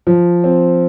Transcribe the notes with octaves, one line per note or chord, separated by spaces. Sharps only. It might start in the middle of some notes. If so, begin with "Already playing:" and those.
F3
C4